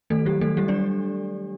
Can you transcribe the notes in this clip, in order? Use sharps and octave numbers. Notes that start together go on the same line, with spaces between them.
D#3 A3 A4
F#3 G3 G4
D#3 A3 A4
G3 A3 G4
D4 D5